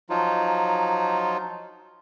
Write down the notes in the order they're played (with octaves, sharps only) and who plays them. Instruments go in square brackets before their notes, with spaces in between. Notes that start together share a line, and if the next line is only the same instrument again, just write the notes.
[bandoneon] F3 F#3 D#4 F4